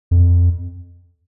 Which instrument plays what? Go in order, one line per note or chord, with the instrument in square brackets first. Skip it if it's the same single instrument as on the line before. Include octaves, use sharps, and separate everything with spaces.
[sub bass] F2